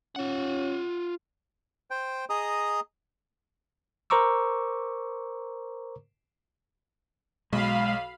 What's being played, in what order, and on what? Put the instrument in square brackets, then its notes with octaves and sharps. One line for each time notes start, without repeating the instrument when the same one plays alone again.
[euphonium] C#4 [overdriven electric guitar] F4 F#5
[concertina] C5 G5
G#4 D#5 A#5 D#6
[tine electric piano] A#4 C5 A#5 C#6 D6 E6
[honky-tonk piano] B1 [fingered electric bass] G#3 [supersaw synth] F5 B5